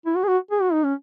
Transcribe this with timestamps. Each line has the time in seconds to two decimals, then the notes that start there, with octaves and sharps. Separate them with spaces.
0.06 E4
0.16 F#4
0.23 G#4
0.28 F#4
0.51 G#4
0.62 F#4
0.72 D#4
0.84 C#4